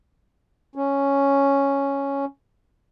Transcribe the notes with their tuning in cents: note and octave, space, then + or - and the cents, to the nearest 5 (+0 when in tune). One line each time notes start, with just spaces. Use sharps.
C#4 +0